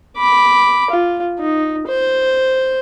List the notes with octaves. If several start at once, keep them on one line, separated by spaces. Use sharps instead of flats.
B5 D6
F4
D#4
C5